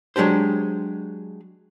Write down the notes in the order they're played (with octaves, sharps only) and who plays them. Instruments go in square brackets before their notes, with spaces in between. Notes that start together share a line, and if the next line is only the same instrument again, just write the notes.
[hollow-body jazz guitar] F#3 G#3 D4 G4 C5